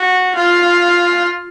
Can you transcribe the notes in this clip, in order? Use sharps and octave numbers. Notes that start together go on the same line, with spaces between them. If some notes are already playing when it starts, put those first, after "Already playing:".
Already playing: F#4
F4